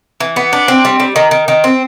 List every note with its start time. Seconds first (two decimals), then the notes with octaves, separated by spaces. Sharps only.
0.20 E3
0.36 B3
0.53 D4
0.68 C4
0.85 G3
1.00 G3
1.16 D#3
1.31 D#3
1.48 D#3
1.64 C4